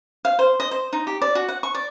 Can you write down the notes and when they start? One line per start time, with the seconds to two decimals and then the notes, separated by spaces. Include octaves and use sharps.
0.25 F5
0.39 C5
0.60 D#5
0.71 C5
0.93 D#4
1.07 G4
1.22 D5
1.35 F#4
1.48 F#5
1.63 C#6
1.75 D5